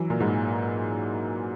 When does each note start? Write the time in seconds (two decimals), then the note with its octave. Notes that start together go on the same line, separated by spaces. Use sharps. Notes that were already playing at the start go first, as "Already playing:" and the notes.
Already playing: E3 F#3
0.10 A#2
0.20 G#2